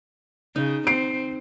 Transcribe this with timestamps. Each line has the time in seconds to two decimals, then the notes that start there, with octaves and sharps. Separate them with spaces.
0.56 C#3 D#4
0.87 C4 C7 D7